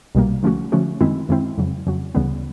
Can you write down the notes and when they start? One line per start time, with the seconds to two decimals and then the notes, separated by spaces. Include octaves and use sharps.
0.15 C2 B2 G3 A#3
0.43 D3 F3 A3 C#4 F#4
0.72 D3 F3 A3 C#4 F#4
1.01 F#2 D#3 G#3 C4 E4
1.29 F#2 D#3 G#3 C4 E4
1.58 F2 C#3 F#3
1.87 F2 C#3 F#3
2.15 D2 C#3 E3 G3 B3